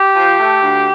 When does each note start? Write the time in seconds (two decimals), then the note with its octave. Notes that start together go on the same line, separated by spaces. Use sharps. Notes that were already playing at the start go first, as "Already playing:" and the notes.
Already playing: G4
0.15 F3
0.39 A3
0.61 D2